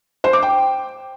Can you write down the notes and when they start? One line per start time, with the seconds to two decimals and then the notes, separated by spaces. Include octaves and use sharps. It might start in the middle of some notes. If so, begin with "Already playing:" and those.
0.24 C5
0.33 D6
0.42 G5